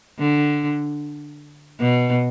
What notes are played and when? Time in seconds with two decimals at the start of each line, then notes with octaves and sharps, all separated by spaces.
0.18 D3
1.80 B2